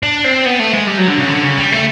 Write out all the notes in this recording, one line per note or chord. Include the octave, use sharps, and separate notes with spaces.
D4
C4
B3
A3
G#3
G3
F#3
D3
C#3
D3
C#3
G3
A3